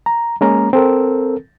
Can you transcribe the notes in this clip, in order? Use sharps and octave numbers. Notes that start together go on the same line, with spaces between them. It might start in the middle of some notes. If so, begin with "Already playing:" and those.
A#5
G#3 A#3 C#4 A#5
C4 A4 A#4